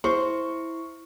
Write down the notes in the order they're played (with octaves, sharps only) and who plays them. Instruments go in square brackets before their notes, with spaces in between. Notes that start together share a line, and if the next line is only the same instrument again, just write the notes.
[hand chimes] E4 [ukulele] C5 [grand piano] C#6